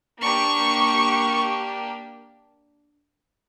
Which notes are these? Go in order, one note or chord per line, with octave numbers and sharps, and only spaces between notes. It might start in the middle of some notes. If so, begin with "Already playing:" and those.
A#3 D4 G4 C#6